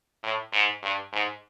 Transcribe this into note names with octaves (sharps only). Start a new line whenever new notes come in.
A2
G#2
G2
G#2